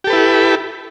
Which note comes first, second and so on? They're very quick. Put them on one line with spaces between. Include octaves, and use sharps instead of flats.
G4 A4 B4 E4